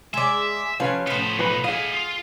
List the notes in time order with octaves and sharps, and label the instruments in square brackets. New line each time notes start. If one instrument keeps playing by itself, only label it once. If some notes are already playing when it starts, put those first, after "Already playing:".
[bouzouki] G#3 D5 [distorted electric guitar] E5
[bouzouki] F3 G3 C#5 [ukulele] C#4 B4 F5
[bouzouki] A2 F3 [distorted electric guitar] B3 C5
[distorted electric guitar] B2 D#4 [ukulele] B4 B5
[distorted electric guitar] E4 D#5 [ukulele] G#4 F5 [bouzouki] F#5
[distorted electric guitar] F4